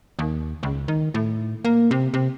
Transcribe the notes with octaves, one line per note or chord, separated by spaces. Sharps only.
D#2
C#2
D#3
A2
A#3
C3
C3